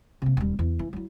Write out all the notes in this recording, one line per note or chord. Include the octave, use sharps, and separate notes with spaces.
C3 A#3
D#1 G3
E2
E3
F#3 E4